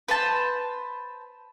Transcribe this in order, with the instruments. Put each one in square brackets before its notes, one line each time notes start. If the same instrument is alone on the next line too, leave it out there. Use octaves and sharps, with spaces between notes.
[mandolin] B4 C5 A5